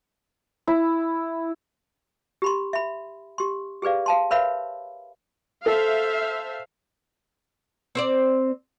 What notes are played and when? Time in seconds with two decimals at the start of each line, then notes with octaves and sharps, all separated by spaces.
0.67 E4
2.42 G4 B5 C6
2.73 E5 B5
3.38 G4 C6
3.82 G4 G#4 B4 D5 F5
4.06 F5 A5 C6
4.31 A#4 B4 C#5 E5 F5 B5
5.66 A4 C5 E5 F5
7.95 C4 C5 D5